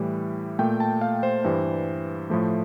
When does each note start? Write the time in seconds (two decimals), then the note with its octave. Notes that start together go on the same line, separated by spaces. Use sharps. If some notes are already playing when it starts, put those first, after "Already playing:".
Already playing: A2 E3 G3
0.59 A#2 A3 G5
0.80 A5
1.01 F5
1.23 C5
1.44 G2 E3 G3
2.30 A2 F3 A3